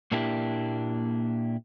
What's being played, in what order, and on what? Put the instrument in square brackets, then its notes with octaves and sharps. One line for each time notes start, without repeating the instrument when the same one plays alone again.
[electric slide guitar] A#2 A#3 D4 E4 G4